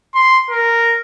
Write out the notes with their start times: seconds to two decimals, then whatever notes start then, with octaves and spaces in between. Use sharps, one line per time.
0.14 C6
0.50 A#4